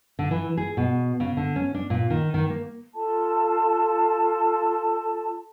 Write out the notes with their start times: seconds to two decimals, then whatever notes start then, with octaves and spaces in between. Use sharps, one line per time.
0.19 D3
0.31 E3
0.57 G#4
0.77 B2
1.20 C#3
1.37 D3
1.56 C#4
1.74 D4
1.90 A#2
2.10 D#3
2.34 D#3
2.50 A#3
2.95 F4 A4 A5